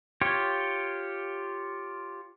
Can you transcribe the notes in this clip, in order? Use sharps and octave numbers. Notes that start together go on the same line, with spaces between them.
F4 G4 C#5